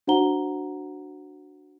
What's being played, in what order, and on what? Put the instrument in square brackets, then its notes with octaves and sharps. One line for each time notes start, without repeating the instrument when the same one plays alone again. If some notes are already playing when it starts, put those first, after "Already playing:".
[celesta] D4 F#4 C5 F#5 A#5 G7